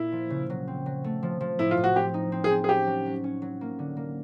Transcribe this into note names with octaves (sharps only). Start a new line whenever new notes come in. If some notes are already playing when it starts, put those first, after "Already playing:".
Already playing: A#2 A#3 E4
F3
C#3
F#3
C4
F#3
A3
F3
F3
A2 E4
F4
A2
F#4
C4 G4
D#4
C4
G#4
C4
G#4
C#4 G4
F#3
F#3
C#4
F#3
A#3
D3
A#3